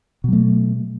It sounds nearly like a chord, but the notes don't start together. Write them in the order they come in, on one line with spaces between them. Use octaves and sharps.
B2 F#3 A3